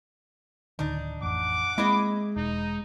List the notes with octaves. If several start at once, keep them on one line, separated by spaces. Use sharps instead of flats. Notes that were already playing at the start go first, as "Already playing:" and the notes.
D1 D3 D#3 D4 D#4
A1 F2 F#5 D6
G#3 A#3 C4 E4 G#4 D#5
E1 D#4